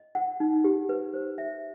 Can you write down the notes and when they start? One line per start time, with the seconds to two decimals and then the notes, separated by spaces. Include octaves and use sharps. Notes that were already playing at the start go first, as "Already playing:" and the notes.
Already playing: D#5
0.15 F#5
0.40 D#4
0.64 G4
0.89 B4
1.14 C5
1.38 E5